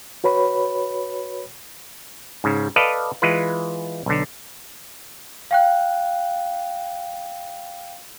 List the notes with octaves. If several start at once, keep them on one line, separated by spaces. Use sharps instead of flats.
F#4 B4 C#5 B5
G#2 C#3
A4 B4 D5 D#5 F5
E3 G#3 F4 B4
B1 D3
F5 G5 F#6